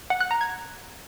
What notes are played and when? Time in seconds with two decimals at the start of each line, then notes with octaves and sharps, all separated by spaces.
0.10 F#5
0.21 F#6
0.31 A#5
0.41 G#6